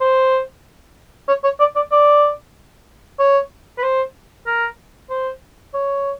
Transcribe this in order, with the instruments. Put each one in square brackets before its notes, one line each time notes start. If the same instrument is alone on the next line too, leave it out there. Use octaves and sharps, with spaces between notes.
[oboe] C5
C#5
C#5
D5
D5
D5
C#5
B4
C5
A#4
C5
C#5